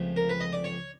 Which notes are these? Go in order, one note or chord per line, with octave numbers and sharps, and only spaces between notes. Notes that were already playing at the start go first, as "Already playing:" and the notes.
Already playing: C#2 C3 F3 A3
A#4
B4
D#5
D5
C#5